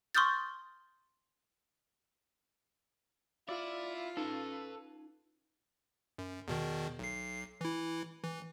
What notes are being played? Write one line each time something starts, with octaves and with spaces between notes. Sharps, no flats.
C6 C#6 D#6 F6 G6 A6
E4 F4 D5 E6 F6
C#4 D#4 A4 B4 A5
F#2
E2 B2 D#3
B1 C7
E3 E4
E3